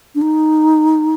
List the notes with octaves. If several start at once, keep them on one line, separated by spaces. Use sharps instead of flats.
D4
D#4